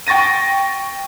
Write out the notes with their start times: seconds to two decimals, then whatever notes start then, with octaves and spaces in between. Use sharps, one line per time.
0.07 G5 C#6 A6 A#6 D#7